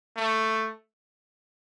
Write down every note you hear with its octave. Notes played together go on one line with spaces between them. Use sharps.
A3